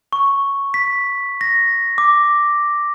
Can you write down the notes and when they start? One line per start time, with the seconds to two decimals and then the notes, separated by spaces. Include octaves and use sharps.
0.13 C#6
0.74 B6
1.41 A#6
1.98 D6